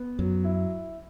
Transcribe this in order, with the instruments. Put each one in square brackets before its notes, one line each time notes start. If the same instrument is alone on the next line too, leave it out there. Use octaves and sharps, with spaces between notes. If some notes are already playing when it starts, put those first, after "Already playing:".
Already playing: [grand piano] B3
[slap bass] F#2 [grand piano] F#3
[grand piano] E4